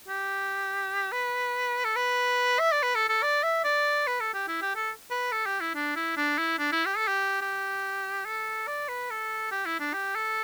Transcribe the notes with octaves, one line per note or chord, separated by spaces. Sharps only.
G4
B4
A4
B4
E5
D5
B4
A4
A4
D5
E5
D5
B4
A4
G4
E4
G4
A4
B4
A4
G4
E4
D4
E4
D4
E4
D4
E4
G4
A4
G4
G4
A4
D5
B4
A4
G4
E4
D4
G4
A4